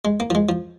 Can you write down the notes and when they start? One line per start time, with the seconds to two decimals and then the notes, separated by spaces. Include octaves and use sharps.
0.05 G#3
0.20 A#3
0.30 F3
0.35 G#3
0.49 F3